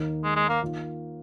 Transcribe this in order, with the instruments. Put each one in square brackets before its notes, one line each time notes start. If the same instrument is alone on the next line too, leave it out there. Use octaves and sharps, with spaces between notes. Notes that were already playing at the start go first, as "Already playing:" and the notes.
Already playing: [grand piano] D#2 D#3 A#3 D#4
[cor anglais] G#3
G#3
A#3
[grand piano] D#3 A#3 F4